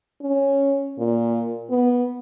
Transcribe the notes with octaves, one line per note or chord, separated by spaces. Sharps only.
C#4
A#2
B3